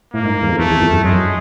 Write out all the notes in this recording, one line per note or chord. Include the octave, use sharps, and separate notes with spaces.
A2 A#3
G#2
E2
F2
E2 A3
E2
F2
F#2
F#2 G#3